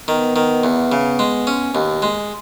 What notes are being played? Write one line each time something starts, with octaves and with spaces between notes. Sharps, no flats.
D#3 B3
D#3
E2
C#3
G#3
C#4
D#2 A#3
G#3